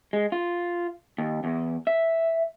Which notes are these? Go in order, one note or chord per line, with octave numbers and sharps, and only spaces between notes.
G#3
F4
D#2
E2
E5